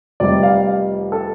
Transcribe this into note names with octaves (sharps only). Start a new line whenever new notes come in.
F1 F2 C3 G3 D5
F5
F5
A4